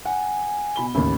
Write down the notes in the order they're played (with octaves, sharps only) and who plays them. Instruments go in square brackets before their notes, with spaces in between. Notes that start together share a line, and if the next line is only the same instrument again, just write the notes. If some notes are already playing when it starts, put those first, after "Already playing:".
[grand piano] F#5 [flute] G#5
[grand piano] B2 B5 G7
[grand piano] A1 D#2 [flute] B5